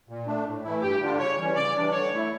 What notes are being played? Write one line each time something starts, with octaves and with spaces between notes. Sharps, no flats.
A#2
A3 D4
A2
E3 A3 E4
G2 G4
D3 G3 D4 F4
C#3 C#5
E3 G3 C#4
C#3 D5
E3 G3 D4
D3 C#5
A3 E4